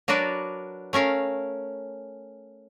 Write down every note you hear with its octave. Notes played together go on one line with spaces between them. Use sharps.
F#3 D4 F#4 A#4 B4 D5
A3 C#4 A#4 F5